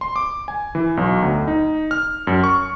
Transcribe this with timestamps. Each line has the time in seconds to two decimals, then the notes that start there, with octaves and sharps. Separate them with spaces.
0.01 C6
0.16 D6
0.48 G#5
0.75 E3
0.97 B1
1.22 D2
1.48 D#4
1.91 F6
2.27 F#2
2.44 C#6